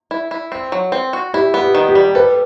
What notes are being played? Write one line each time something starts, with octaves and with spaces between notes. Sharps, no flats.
E4
E4
C4
F#3
C4
F#4
E4 G4
B3
G4
D#3
G4
G3
A4 B4